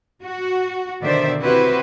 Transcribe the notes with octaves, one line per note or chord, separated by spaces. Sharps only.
F#4
B2 D3 D#3 C5 D5 E5
C4 E4 F#4 G4 B4 C5